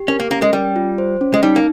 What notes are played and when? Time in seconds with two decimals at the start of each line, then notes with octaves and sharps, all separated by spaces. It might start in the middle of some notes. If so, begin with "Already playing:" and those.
Already playing: G4
0.08 C#4 A#4
0.20 A#3
0.30 A#3 C#4
0.42 G#3
0.53 G3 G5
0.76 F4
0.98 C5
1.21 C#4
1.34 G#3
1.43 G3 D#4
1.56 A#3